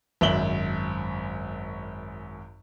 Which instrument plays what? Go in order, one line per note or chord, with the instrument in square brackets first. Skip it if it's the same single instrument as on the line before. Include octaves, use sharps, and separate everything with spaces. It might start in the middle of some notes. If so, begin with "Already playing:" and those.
[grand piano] G#1 F#2 E5 F#7 G7